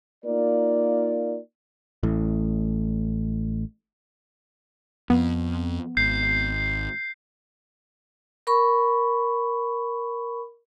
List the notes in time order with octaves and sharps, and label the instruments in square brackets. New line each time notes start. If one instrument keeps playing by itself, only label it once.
[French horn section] A#3 D#4 F4 A#4 D5
[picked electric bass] A1 A2
[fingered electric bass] F2 [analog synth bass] B3
[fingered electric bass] G#1 [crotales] G6 C7
[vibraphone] A#4 B5 C#6